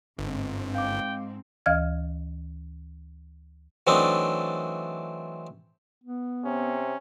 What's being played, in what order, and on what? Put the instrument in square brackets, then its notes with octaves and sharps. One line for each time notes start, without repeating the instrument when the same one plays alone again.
[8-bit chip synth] G1 [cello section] G#2 C4
[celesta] F5 D6 [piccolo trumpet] G5
[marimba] D2 E3 D#5 F5 F6 G#6
[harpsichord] E3 F#3 A3 C4 D4 D#4
[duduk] B3
[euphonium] C3 [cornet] C#4